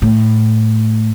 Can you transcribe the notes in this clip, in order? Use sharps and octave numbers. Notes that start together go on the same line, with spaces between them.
A2